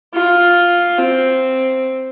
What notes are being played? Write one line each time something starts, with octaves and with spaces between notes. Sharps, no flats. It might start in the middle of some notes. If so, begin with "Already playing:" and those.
F4
C4